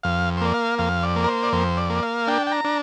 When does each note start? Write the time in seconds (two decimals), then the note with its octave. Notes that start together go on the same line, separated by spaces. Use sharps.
0.03 F2 F5
0.37 C5
0.41 A#3 D5
0.54 F5
0.79 F2 F5
1.03 D5
1.16 A#3
1.24 A#4
1.28 C5
1.43 D5
1.52 F2 C5
1.77 D5
1.90 A#3
2.03 F5
2.27 D4 G5
2.47 G5
2.52 A#5
2.65 D4